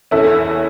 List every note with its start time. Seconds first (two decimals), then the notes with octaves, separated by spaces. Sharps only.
0.11 E2 E3 C#4 E4 A4